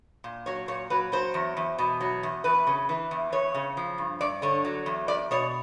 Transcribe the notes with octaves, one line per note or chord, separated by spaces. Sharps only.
A#2
F#3 C#5
A#2 C#5
F#3 B4
F#3 C5
E2
E2
B2
F#3
E2
E2 B4
C#3
E3
E2
E2 C#5
C#3
F3
G2
G2 D5
D3 C#5
F#3
E2
E2 D5
B2 C#5